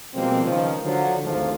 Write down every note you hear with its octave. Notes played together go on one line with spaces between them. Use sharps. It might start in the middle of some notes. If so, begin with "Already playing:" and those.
B2 F3 G3 G#3 A#3 C4
C#2 D#3 F3
D3 F3 F#3
G#1 D2 G#2 F3